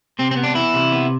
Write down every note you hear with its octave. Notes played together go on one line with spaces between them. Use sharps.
C3 C4
C4
B3
D4
E3 E4
C3
B3